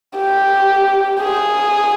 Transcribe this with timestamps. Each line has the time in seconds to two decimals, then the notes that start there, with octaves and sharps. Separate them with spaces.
0.18 G4
1.20 G#4